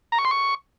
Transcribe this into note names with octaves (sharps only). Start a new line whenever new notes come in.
A#5
C#6
C6
C#6